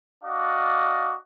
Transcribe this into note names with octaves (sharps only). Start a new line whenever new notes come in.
D4 F#4 D5 D#5 F5